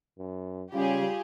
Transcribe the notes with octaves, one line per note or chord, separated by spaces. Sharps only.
F#2
C#3 G3 F4 G4 G#4